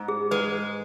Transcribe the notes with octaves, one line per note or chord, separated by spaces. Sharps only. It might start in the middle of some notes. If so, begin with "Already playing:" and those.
Already playing: G#2
G#4
G#3 B4